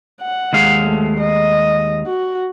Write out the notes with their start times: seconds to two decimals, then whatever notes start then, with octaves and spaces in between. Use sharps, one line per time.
0.21 F#5
0.53 D#2 G#3 F5
0.85 A3
1.20 D#5
2.06 F#4